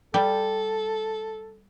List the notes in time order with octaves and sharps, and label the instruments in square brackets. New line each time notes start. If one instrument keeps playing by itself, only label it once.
[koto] G3 G5 [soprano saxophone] A4